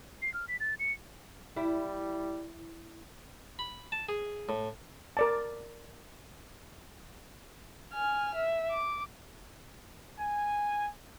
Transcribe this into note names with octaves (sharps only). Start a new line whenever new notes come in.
C7
F6
B6
A6
C#7
G3 E4
B5
A5
G#4
A2
A#4 D5 A5
G#5 F6
E5
D6
G#5